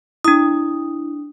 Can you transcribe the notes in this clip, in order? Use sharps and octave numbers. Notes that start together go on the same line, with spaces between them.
D4 E4 D#6